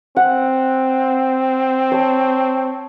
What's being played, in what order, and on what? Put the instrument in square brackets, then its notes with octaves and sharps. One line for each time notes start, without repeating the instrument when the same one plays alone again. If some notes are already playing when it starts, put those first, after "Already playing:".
[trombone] C4 [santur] F#5
[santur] C#5 A5